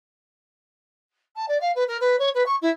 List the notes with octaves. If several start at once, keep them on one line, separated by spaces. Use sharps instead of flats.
A5
D5
F5
B4
A#4
B4
C#5
B4
C#6
E4